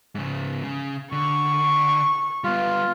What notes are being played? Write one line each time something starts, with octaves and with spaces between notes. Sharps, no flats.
G#2 C#3
C#3
D3 C#6
G3 B3 F4